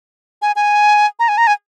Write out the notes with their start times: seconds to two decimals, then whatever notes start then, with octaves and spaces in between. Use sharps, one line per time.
0.42 G#5
0.56 G#5
1.19 A#5
1.28 G#5
1.38 A#5
1.47 G#5